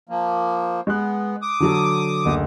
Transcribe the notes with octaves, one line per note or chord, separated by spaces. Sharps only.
F3 A#3
G#3 B3 F#6
D6 D#6
D3 F#3 A4
F#1 D2